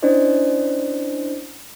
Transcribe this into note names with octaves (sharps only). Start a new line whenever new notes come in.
C#4 D4 E4 C5 D5 D#5